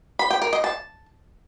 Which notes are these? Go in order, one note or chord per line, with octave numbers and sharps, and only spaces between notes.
B5
G5
A#4
D#5
A5